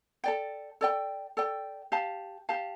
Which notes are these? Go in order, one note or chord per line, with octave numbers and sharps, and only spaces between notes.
A4 D5 G5
A4 D5 G5
A4 D5 G5
G4 F5 A5
G4 F5 A5